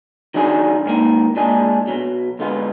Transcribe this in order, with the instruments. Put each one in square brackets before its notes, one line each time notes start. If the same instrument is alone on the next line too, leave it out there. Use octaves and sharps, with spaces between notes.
[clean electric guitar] D#3 F#3 D4 G#4
G#2 D#3 A#3
A#2 G#3 D4 G#4
B1 B2 F#3
D2 D3 G#3 B3 F4